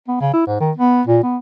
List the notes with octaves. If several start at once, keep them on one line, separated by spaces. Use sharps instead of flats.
B3
C#3
E4
G#2
D#3
B3
A#2
B3